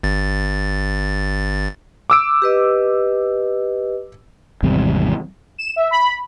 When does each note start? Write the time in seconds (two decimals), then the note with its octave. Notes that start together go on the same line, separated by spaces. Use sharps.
0.03 G1 A6
2.10 D6 E6 D7
2.42 G4 B4 D#5
4.63 G#1 E2 C3 G3
5.58 E7
5.76 E5
5.91 B5